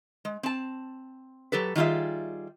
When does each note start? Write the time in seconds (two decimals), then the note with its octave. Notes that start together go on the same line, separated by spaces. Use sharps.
0.25 G#3
0.43 C4 A5
1.52 F#3 G4 A4 B4
1.76 D#3 G3 F4 G#4 E5